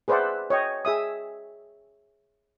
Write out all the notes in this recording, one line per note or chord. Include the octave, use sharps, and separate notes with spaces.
G#4 B4 C5 D5 E5 F#5
C#5 D#5 G5
G#4 E5 D#6